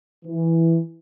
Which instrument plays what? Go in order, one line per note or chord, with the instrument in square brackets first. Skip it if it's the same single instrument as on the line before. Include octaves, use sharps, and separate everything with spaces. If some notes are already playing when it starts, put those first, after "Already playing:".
[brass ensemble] E3